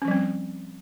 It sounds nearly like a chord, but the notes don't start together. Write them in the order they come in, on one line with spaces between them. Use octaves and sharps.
C#4 F3 G3 C4